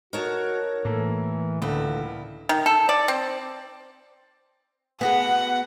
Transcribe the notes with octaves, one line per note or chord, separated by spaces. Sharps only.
D#4 F#4 A#4 C#5 A5
A2 E3 A#3 A4
C#2 A#2 D3 E4
D#3
A4
D5
C4
B3 F#4 G#4 F#5